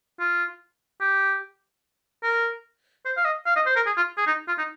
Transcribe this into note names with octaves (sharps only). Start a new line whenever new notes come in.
F4
G4
A#4
C5
F5
D#5
F5
D#5
C5
A#4
G#4
F4
G#4
D#4
F4
D#4